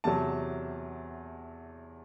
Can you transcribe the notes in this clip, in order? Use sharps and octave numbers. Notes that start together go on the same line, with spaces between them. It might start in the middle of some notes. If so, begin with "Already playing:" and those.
E2 C3 F#3 A5